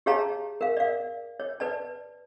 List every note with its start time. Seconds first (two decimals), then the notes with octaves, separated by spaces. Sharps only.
0.06 G4 G#4 C#5 F5 A5 A#5
0.61 A#4 F5
0.77 D5 F5
1.40 C#5
1.60 B4 D5 A5